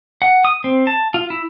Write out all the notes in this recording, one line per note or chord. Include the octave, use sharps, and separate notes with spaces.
F#5
D#6
C4
A5
F4
E4